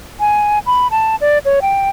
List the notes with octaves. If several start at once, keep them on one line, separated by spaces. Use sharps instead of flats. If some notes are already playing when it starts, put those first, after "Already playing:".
G#5
B5
A5
D5
C#5
G5